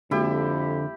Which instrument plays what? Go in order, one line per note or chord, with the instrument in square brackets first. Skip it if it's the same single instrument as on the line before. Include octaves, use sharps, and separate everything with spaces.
[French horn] F2 [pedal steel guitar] D3 [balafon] G#3 A#3 F#4 [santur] E4 G4